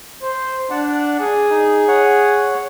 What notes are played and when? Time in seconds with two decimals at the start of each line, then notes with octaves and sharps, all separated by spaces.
0.23 C5
0.71 D4 D5 F#5 A5
1.20 G#4
1.50 D#4
1.88 C#5 F#5